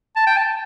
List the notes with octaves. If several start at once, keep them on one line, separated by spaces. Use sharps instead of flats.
A5
G5
A5